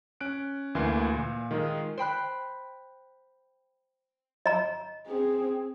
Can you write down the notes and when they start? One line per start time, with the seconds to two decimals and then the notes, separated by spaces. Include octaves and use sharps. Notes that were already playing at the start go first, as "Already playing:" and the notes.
0.21 C#4 F#6 D7
0.75 D2 E3 A#3 G#5 C6 C7
1.14 A#2
1.51 D#3 G#3 F4 G#4 A#4 D#5
1.98 C5 G5 B5 F#6
4.46 D#5 A#5
5.08 C4 G#4